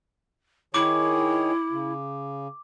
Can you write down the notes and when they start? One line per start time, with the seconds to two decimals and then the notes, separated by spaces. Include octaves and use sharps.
0.74 D#3 E4 G#4 C#5 D6
1.71 C#3